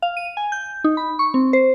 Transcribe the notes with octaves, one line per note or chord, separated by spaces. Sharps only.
F5
D#7
G#5
G6
D#4
B5
C#6
C4
C5